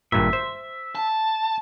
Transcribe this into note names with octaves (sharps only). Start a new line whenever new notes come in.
G#1 G2 A#2 E5
C5
A5